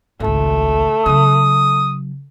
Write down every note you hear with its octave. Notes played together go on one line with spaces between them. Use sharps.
G#1 C#2 A3
C#3 F#3 D#6